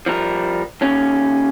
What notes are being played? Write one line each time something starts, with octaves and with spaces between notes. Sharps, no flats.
F3 G3 A#4
D#2 C#4